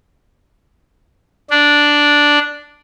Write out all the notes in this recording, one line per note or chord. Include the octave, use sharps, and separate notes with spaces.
D4